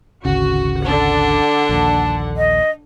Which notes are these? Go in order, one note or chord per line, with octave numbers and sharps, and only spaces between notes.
G#1 D2 C#3 F#4
D3 D4 F#5
A#1 D#2 A5
D#5